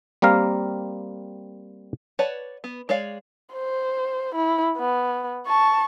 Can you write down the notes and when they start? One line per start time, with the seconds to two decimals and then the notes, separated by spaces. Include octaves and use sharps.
0.22 G3 A#3 C4 A#4 F5
2.19 B4 C#5 D5 F#5 A5
2.64 B3
2.89 G#3 C#5 D5 F5
3.53 C5
4.34 E4
4.77 B3
5.47 A5 C#6